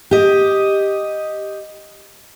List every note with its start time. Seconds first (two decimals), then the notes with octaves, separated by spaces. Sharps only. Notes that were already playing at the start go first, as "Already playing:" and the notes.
0.11 G4 D#5